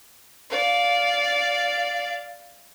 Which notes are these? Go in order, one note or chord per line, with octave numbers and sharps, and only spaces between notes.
D5 F5